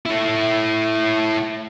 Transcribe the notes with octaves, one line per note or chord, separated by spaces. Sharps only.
A3 E4